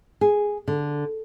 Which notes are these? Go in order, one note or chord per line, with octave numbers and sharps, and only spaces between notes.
G#4
D3